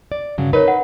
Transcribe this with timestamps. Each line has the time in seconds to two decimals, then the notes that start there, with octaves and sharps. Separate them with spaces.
0.12 D5
0.38 G2 C#3 F#3
0.53 D#4 A#4 B4 C#5
0.68 F#5